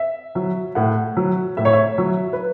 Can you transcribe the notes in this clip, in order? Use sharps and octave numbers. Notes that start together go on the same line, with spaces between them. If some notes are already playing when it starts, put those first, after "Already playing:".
Already playing: E5
F#3
A2 F#5
F#3
A2 E5
C#5
E5
F#3
B4